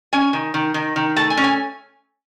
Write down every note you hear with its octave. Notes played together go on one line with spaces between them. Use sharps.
C#4 G#5
D#3
D#3
D#3
D#3
A3 A5
G#5
C#4
G#5